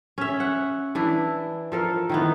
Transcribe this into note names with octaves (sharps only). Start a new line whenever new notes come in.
C#4 E5
F#5
E3 D4 E4
F3 A4 A#4
D#3 E3 B3